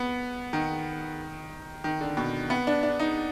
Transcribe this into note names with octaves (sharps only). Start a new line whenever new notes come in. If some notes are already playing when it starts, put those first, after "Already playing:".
Already playing: B3
D#3
D#3
D3
B2
B3
D4
D4
D#4